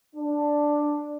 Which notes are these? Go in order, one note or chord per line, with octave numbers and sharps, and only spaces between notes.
D4